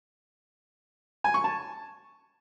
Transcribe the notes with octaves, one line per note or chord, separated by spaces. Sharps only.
G#5
C#6
A5